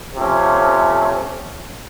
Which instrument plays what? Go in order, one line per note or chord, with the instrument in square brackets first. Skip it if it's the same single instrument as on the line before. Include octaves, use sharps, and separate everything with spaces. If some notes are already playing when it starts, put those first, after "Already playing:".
[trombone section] C3 F3 A3 C#4